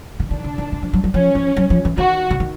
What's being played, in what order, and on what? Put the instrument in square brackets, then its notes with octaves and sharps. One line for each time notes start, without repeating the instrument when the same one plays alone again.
[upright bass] D3
[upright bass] D#3 [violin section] D4
[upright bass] D3
D#3
D3
F3
F#3
F#3
[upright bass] F3 [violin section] C#4
[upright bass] F3
F#3
F3
E3
[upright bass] D#3 [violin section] F#4
[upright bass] D3
D#3